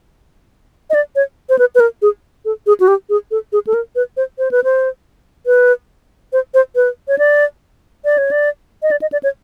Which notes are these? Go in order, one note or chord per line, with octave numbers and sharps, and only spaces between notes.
D#5
D5
C#5
C5
B4
B4
A#4
G#4
A4
G#4
F#4
G4
G#4
A4
G#4
A4
A#4
B4
C5
C5
B4
C5
B4
C5
C5
B4
C#5
D5
D5
C#5
D5
D#5
D5
D#5
D5
C#5